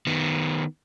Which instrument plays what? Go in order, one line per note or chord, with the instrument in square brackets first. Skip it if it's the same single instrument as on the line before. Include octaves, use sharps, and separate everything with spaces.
[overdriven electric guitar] D#3 B3